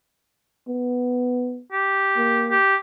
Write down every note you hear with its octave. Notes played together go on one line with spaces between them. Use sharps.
B3
G4
A#3
G4